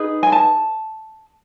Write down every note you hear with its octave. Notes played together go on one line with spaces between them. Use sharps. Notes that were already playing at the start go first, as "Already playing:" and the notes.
Already playing: D#4 G#4 B4
G#5
A5